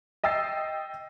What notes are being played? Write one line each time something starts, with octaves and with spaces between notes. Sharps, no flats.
D#5 G5 E6 A6 C7